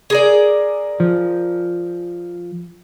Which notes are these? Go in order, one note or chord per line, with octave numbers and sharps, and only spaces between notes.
G#4 A#4 D5
F3